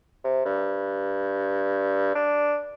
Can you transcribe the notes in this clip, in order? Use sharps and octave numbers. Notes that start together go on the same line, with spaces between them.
C3
G2
D4